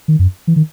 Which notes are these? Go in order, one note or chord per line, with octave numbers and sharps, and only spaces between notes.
D#3
F#2
E3
D#3